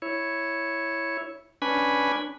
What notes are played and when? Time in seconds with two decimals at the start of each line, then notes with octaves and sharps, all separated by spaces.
0.02 E4 C#5
1.62 C#4 D4 B4 G#5 B5